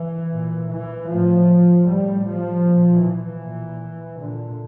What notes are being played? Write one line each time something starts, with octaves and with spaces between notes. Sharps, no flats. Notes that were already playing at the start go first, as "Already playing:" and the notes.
Already playing: E3
A#2
E3
A2 F3
A2 G3
F3
A#2
E3
A#2
A#2 D3